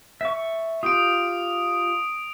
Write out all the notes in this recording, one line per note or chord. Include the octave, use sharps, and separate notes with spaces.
E5 C#6
F4 G4 D#6 D7